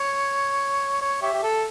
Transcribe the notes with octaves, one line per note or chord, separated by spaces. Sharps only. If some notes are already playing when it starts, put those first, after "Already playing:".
Already playing: C#5
C#5
G4 C#5 E5
G4
A4